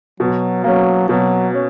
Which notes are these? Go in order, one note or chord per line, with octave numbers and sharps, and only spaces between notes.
B2 F#3
F#3 A#3 C#4
B2 F#3
C#4